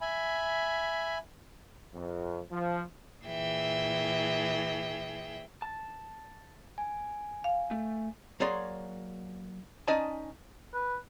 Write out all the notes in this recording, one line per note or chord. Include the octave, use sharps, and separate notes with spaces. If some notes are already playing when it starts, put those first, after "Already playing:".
E5 G#5 B5
F2
F3
A#2 E3 G#4 E5 G5
A5
G#5
F5
A3
F#3 A#3 G#4 C#5 D5 C6
C#4 D#4 D5 D#5 G#5 A5
B4